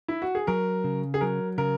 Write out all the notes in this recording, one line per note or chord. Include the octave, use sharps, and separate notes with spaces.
E4
F#4
G#4
F#3 A#4
C#3
G#4
F#3 A#4
C#3 A#4